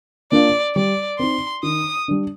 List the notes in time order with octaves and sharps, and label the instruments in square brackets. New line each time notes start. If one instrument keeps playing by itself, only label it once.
[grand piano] A#3 D4 F4 [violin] D5
[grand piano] G3 [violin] D5
[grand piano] C4 D#4 [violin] C6
[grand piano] D#3 [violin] D#6
[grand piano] G3 D4